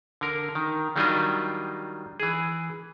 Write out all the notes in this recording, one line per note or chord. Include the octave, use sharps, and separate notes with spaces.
D3 A#4
D#3
D#3 F#3 G3 D4 F4 D#5
E3 G#4